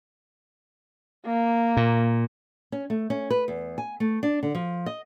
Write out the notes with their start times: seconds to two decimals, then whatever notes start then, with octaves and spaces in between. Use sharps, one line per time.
1.26 A#3
1.77 A#2
2.72 C#4
2.90 A3
3.10 C#4
3.30 B4
3.48 E2
3.78 G#5
4.00 A3
4.23 D4
4.43 D3
4.55 F3
4.86 D#5